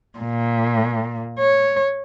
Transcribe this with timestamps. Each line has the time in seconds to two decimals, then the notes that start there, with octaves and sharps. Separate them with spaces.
0.19 A#2
1.39 C#5